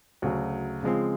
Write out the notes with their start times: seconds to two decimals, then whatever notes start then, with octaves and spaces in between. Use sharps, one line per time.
0.22 D2 C#3 F#3
0.83 C#3 F3 G#3 C4